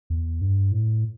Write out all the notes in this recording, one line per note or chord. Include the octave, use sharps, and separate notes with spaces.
E2
G2
A2